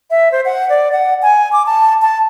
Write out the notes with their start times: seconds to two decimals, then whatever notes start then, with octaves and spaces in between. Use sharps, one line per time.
0.11 E5
0.32 C5
0.45 F#5
0.69 D5
0.92 F#5
1.22 G#5
1.53 D6
1.66 A5
2.02 A5